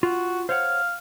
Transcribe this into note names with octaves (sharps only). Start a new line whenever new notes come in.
F4 F#4
C5 C#5 F5 F#5